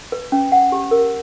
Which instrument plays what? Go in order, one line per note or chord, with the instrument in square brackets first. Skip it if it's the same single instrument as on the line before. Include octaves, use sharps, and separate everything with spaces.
[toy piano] B4
C#4
F#5
G4
A#4